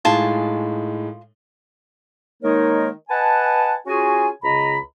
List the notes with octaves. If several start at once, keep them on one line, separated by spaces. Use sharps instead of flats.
A2 G#3 D#4 F4 G#5 A5
D#3 G#3 A#3 D#4 A#4 C#5
B4 D#5 F#5 G#5 A5
C#4 F4 F#4 G#4 G#5
C#2 C#3 D#5 A#5 B5